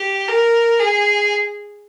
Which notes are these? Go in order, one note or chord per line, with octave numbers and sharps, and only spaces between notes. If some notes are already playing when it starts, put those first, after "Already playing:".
Already playing: G4
A#4
G#4